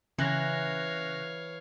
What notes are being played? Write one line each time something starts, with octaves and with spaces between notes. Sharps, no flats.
C#3 E3 C#5 F5 F#6 A#6